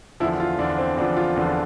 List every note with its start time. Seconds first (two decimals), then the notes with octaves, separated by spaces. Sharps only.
0.20 E2 D3 F3 E4
0.40 F4
0.58 E2 D3 F3 D4
0.79 C4
0.97 E2 D3 F3 D4
1.17 F4
1.36 E2 D3 F3